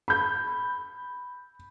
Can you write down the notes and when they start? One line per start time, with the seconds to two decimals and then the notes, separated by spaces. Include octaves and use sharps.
0.08 B5 G6